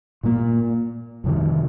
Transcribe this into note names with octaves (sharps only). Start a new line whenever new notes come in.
A#2 A#3
F2 C3 D#3